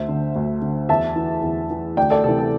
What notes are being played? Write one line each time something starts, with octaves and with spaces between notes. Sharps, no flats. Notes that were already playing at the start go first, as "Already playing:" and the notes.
Already playing: D2 C5 E5
D3
D2
D3
E2 E5 A5
E3
E2
E3
D2 D5 G5
A4 D5
C3 E3 A4
A4